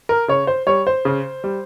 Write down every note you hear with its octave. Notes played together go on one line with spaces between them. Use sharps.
A#4
C#3 C#5
C5
G3 C#5
C5
C#3
G3